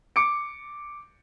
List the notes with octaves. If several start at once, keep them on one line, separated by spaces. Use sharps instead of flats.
D6 C#7 D7